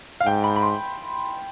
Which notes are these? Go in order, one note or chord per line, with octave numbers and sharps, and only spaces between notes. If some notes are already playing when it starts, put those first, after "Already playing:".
F5
G#2 G5
B5
B5
C6